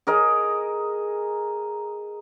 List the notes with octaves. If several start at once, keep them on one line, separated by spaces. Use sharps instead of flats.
G#4 A#4 D#5